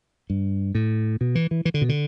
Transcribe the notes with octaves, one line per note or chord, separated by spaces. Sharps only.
G2
A2
B2
E3
E3
E3
D3
B2
D3